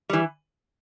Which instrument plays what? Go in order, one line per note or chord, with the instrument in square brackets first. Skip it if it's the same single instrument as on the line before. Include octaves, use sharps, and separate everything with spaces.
[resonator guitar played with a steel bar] E3 G3